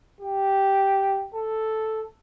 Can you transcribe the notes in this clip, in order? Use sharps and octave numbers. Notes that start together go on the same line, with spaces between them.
G4
A4